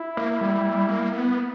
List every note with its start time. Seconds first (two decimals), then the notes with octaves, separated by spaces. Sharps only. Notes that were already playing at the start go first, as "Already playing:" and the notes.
Already playing: E4
0.17 A#3
0.41 G3
0.65 G3
0.89 A#3
1.12 B3